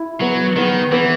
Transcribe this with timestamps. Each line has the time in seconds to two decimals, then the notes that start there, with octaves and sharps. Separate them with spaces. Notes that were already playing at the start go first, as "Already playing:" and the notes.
Already playing: E4
0.21 F#3 B3
0.56 D#3 B3
0.92 E3 B3